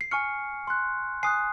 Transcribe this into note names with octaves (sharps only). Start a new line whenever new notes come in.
C7
G#5 C#6 F6 C#7
C6 F#6
G#5 D#6 F#6 C7